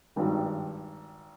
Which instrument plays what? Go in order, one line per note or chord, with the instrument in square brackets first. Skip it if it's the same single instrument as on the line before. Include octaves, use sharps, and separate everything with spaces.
[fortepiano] G#1 G2 D#3